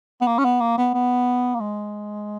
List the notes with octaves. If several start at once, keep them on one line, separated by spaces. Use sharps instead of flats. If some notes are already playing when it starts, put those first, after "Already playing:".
B3
A#3
C#4
B3
A#3
B3
B3
A#3
G#3